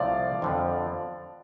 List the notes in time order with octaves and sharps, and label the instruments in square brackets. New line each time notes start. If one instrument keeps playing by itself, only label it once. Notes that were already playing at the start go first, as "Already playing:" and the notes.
Already playing: [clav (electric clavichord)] C2 C3 F3 A3 [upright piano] D5 F5
[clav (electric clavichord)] F2 D3 F3